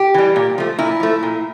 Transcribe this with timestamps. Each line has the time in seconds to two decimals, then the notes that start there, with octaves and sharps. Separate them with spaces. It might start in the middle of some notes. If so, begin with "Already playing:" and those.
Already playing: G4
0.14 E3 G3
0.36 A#2
0.58 F3 A3
0.79 A#2 E4
1.00 F3 A3
1.23 A#2